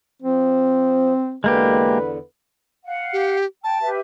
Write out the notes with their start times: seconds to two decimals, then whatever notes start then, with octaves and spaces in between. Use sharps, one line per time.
0.22 F3 C4
1.44 E2 D3 G#3 A#3 G4 B4
2.85 F5 F#5
3.13 G4
3.64 G5 A5
3.81 G4 B4 E5